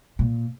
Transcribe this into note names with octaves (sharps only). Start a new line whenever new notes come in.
A#2